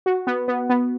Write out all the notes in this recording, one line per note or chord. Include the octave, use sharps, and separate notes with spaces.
F#4
B3
B3
B3